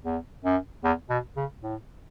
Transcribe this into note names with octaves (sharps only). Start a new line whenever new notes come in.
E2
F#2
E2
B2
C#3
A2